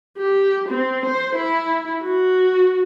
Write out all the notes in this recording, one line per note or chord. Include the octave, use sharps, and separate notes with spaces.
G4
C4
C5
E4
F#4